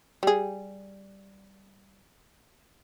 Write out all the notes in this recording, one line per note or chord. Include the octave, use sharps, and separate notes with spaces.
G3 G#4